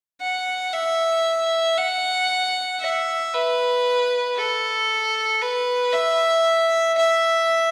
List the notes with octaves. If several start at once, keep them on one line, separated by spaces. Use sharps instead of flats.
F#5
E5
F#5
E5
B4
A4
B4
E5
E5